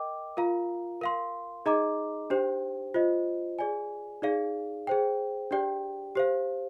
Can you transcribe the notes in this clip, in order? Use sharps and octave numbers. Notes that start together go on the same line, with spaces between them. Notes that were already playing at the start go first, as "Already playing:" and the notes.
Already playing: A#4 D#5 G5 D6
F4 A#4 F5 A#5
A#4 F5 C6
D#4 G#4 D#5 A#5 D6
D4 G4 C5 G5
F4 C5 D#5
G#4 D5 G#5
D#4 G#4 D5 F5
G#4 C5 G5
D4 G4 D5 G5
G4 C5 F5